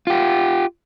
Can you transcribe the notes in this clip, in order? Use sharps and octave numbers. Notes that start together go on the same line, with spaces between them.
F4 G4